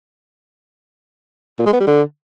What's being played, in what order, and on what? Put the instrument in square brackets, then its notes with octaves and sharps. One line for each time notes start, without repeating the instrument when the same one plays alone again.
[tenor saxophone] A#2
G#3
B3
G3
D3